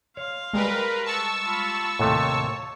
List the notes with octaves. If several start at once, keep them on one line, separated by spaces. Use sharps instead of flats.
C#5 F5 C6
G3 G#3 A#4 B4
A5 C#6 E6
F4 B5
D#2 A2 C3 A3 C#5